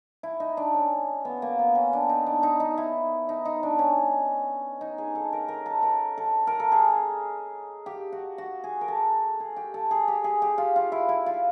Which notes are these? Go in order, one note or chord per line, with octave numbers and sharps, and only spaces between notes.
E4
D#4
D4
C#4
B3
A#3
B3
C#4
D4
D#4
D4
D#4
D#4
E4
D#4
D#4
D4
C#4
D#4
G#4
A4
A#4
A#4
A4
A#4
A4
A#4
A4
G#4
G4
F#4
F#4
G#4
A#4
A4
G#4
G4
A4
G#4
G4
G#4
G4
F4
F4
E4
E4
F4